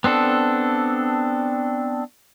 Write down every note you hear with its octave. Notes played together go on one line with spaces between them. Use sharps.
B3 C4 D4 A4